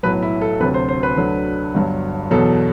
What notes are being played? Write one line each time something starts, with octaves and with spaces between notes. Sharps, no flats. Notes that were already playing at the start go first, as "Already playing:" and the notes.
B1 A2 F#3 B4
E4
A4
D2 C3 F#3 B4
C5
C5
B4
D2 D3 F#3
G1 G2 F#3
E2 B2 F#3 A4